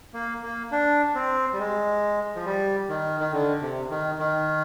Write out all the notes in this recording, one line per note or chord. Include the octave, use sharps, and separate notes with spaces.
A#3
A#3
D4
C4
G3
G#3
F3
G3
D#3
D#3
D3
C3
D#3
D#3